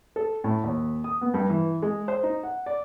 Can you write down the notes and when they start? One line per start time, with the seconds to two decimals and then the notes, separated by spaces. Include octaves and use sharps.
0.16 A4
0.44 A2
0.64 D#2
1.04 D#6
1.21 B3
1.34 G2
1.50 E3
1.82 G#3
2.08 C5
2.23 D#4
2.43 F#5
2.66 D5